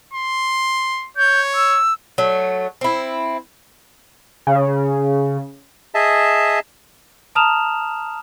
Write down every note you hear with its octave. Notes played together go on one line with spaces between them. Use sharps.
C6
C#5 G6
E6
F#3 A3
C4 E4
C#3
G#4 D#5 E5 A5
A5 A#5 D#6 F6 E7 F7